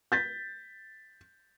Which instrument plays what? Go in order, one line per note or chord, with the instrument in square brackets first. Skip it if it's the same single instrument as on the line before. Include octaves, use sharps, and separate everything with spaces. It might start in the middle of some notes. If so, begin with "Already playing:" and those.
[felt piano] G6 A6 B6